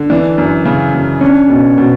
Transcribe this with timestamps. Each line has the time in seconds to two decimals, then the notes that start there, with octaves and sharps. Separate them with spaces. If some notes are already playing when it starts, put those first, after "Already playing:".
Already playing: D3
0.10 E3 D4
0.38 F#2
0.65 C#3
0.94 F#2
1.21 C#4 D4
1.49 B2
1.78 B2